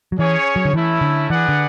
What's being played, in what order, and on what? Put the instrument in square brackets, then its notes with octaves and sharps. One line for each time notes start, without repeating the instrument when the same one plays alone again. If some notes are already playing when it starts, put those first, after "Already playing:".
[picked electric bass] F#3
[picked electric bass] E3 [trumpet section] C#4 G#4 C#5
[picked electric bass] F#3
D3
[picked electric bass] E3 [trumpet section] A3 C#4 E4
[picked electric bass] D3
[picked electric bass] E3 [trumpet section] D4 G#4 B4 D5 F#5
[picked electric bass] D3